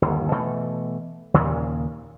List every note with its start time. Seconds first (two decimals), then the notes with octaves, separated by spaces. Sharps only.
0.02 G1 D#2
0.32 B2 E3 A3
1.34 D#2 A#2 C#3